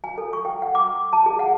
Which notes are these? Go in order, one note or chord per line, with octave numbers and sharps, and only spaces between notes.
G#5
A4
C#6
G5
F#5
D6
A5
G#4
F#5